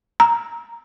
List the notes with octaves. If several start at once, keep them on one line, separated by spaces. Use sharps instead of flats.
A#5